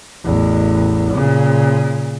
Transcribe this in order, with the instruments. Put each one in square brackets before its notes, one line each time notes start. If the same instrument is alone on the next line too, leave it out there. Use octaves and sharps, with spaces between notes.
[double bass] A1 E2
A#2 C#3